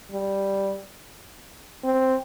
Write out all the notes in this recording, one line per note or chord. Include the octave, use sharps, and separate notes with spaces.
G3
C4